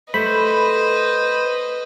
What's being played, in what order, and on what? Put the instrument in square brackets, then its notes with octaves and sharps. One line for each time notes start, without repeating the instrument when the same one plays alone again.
[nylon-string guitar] A3 [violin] B4 D#5 [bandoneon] C5 [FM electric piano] B5